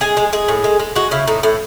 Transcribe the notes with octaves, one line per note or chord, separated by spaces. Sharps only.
G#3 G#4
G#3
G#3 G#4
A2
G#3
G#3
G#3 F#4
C#3 E4
A2 D#4
A2 E4